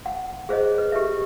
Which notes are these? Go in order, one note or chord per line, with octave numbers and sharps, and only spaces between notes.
F#5
G#4 C5 C#5 D#5
B4
G4 A4 E5